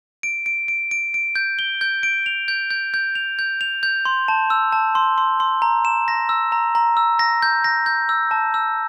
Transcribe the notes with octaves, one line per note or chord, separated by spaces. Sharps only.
D7
D7
D7
D7
D7
G6
G7
G6
D7
F7
G6
G6
G6
F7
G6
F7
G6
C6
A5
E6
A5
C6
C6
C6
A#5
E7
A#6
E6
A#5
A#5
E6
A#6
G6
A#6
G6
E6
A5
E6